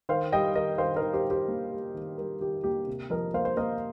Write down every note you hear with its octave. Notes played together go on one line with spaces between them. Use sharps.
D#3 C5 F5
G3 D#5 G5
D#3 A#4 D#5
D#3 C5 F5
A#4 D#5
D#3
G4 C5
D#3
G4 C5
A#3
G3
D#3
G3 A#4
D#3 G4
A#3 G4
C3
F3 A#4 D#5
A#3 C5 F5
C5
A#3 A#4 D#5